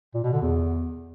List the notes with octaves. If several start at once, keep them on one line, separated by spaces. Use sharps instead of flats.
A#2
B2
D3
E2